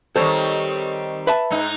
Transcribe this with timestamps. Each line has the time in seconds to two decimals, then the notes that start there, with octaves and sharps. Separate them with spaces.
0.16 D#3 G3 C4 A4 C5 C#5
1.27 B4 E5 A5
1.51 G#2 D#4